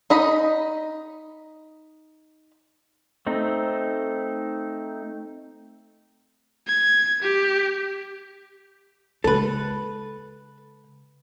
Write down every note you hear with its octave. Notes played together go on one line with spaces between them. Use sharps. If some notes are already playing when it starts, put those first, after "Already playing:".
D#4 D#5 B5
A3 C4 D#4
G#6
G4
C#3 G#3 A4 B4